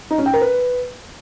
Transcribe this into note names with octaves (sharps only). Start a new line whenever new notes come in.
D#4
C#4
G5
A#4
B4